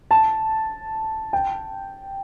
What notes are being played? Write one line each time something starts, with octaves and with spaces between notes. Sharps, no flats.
A5
G5